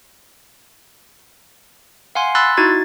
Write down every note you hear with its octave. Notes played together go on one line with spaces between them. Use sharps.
F5 F#5 G#5 C6
B5 C6 E6 F#6 A6
D#4 E4 F#4 G#6 A6